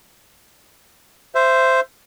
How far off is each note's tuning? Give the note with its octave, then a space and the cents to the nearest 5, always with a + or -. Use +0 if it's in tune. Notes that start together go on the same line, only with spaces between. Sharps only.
C5 -5 E5 +20